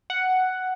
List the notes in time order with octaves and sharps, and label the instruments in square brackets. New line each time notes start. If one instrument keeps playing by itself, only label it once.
[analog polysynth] F#5